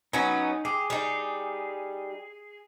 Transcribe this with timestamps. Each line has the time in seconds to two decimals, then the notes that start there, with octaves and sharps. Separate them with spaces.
0.13 F#3 B3 C#4 D#4
0.65 G4 G#4
0.90 G3 D#4